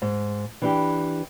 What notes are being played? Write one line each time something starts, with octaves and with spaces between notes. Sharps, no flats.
G#2
E3 D4 G4